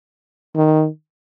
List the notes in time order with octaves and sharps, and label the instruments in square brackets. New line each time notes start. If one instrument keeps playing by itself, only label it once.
[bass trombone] D#3